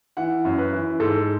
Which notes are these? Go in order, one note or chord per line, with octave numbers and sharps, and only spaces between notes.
E3 F#5
F#2
B4
E3
G#2 A4